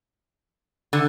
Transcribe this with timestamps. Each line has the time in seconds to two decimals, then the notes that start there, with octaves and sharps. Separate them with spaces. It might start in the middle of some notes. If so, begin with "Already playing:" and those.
0.93 D3